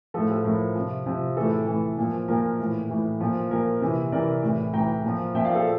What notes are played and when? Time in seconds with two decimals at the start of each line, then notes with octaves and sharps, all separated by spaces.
0.14 A2 F3 A4
0.30 A4
0.45 A2 F3 A#4
0.75 C3 F3
1.06 C3 F3
1.36 A2 E3 A4
1.67 A2 E3
1.98 A#2 F3
2.28 A#2 F3 A#4
2.59 A2 E3
2.89 A2 E3
3.20 A#2 F3
3.51 A#2 F3 A#4
3.81 C3 E3
4.12 C3 E3 A#4 D5
4.43 A2 E3
4.73 A2 E3 G5 A#5
5.04 A#2 F3
5.34 A#2 F3 E5 G5
5.45 D5 F5
5.55 A4